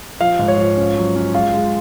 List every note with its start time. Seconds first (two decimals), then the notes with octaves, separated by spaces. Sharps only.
0.20 F3 F5
0.39 G#2
0.48 C#5
0.58 F3
0.77 C#4
0.97 F#3
1.16 C#4
1.35 G#3 F4
1.54 G#3